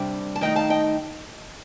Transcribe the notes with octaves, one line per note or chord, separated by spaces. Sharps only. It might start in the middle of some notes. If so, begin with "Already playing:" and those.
Already playing: C3 G3 D4
A5
D#3 A3 D#4 D#5 G5
F5 A5
D#5 G5